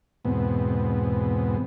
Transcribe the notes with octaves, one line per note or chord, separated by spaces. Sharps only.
E2 G#2 B2 B3 C4